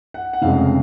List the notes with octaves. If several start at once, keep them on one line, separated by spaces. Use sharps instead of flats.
F#5
F#5
F1 F2 C#3 G#3 F5